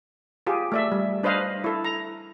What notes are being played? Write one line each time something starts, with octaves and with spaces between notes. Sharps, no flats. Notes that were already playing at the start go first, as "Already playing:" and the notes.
F4 G4 G#4
A3 D5 E5
G3
D4 B4 C5 D#5 F5
E4 A4
A#5